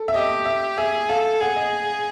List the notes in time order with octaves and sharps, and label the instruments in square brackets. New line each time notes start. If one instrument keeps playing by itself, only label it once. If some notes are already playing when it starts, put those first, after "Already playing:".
Already playing: [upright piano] A4
E5
[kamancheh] G4 [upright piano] D#5
[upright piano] E5
[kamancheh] G#4 [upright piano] E5
[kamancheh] A4 [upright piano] F5
[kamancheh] G#4 [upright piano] F#5
[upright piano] D#5